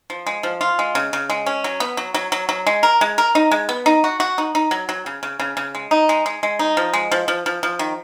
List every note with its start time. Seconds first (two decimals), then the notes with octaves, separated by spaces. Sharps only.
0.10 F3
0.27 G#3
0.43 F3
0.61 F4
0.79 G#3
0.95 C#3
1.13 C#3
1.30 G#3
1.46 C#4
1.64 F#3
1.80 B3
1.97 F#3
2.14 F#3
2.32 F#3
2.49 F#3
2.67 G#3
2.83 A#4
3.01 G#3
3.18 A#4
3.35 D#4
3.51 G#3
3.69 B3
3.86 D#4
4.04 F#4
4.20 F#4
4.38 D#4
4.55 D#4
4.71 F#3
4.89 F#3
5.06 C#3
5.23 C#3
5.40 C#3
5.57 C#3
5.75 G#3
5.91 D#4
6.09 G#3
6.26 G#3
6.43 G#3
6.59 D#4
6.77 F3
6.93 G#3
7.12 F3
7.28 F3
7.46 F3
7.63 F3
7.79 D#3